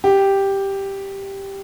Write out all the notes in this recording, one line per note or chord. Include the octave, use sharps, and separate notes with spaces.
G4